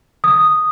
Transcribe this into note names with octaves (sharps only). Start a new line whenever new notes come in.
D#6